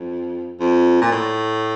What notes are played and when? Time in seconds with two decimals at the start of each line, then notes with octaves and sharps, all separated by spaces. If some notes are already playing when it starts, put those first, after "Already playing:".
Already playing: F2
0.60 F2
1.01 A#2
1.11 A2